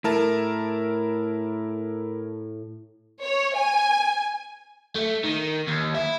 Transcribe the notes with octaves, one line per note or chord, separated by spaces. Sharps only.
A2 E4 A#4 A5
C#5
G#5
A3
D#3
D#2
E4